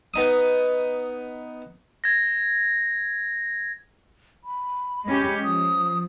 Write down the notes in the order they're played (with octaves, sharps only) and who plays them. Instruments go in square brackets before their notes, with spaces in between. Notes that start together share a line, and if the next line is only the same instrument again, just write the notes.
[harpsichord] B3 D#4 D#6
[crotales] G#6 A#6
[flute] B5
[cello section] G#3 C#4 G4
[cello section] F3 [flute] D#6